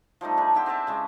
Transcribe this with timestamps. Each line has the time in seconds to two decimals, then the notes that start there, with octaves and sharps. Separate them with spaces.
0.21 F3 G3 A3 D#4
0.37 D4 D#4 G#4
0.54 B3 E4 G4 C5
0.66 C4 G4 E5 A5
0.87 C#3 G#3 C#6